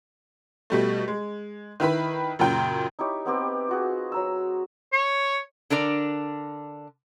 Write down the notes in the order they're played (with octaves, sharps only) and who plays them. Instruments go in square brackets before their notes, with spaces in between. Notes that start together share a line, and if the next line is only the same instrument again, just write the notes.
[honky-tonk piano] B2 G3 A3
G#3
D#3 E4 B4 B5
F#2 A#2 C#3 G5
[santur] D#4 E4 G4 C#5
B3 C4 G4 B4
F4 F#4 G#4
F#3 A#5 E6
[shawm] C#5
[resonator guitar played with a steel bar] D3 D4 A#4 D5